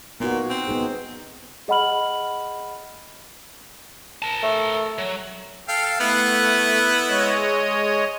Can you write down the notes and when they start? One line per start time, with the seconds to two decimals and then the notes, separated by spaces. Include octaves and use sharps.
0.20 A#2 B3 D#4 F#4
0.50 C4
0.67 B3 D#4 G#4
1.68 G#4 D#5 F#5 B5 F6 F#7
4.22 A#4 A5
4.43 A3
4.98 F#3
5.68 A4 F5 G5
6.00 A3 B3 E4 F#5
7.08 G#3 C#5 D#5